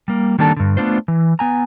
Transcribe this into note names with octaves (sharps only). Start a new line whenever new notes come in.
G3 A#3
D#3 G3 A#3 D4 A4 A5
G2 D3
A3 B3 D4 F4 C5
E3
B3 G#5 A#5